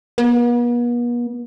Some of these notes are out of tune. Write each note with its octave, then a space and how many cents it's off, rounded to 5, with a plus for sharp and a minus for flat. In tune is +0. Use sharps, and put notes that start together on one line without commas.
B3 -45